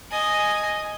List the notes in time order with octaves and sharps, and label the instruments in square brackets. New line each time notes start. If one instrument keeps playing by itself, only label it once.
[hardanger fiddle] D#5 G#5